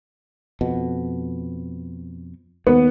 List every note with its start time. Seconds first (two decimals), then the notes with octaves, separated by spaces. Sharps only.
0.61 F2 B2
2.67 D#2 B3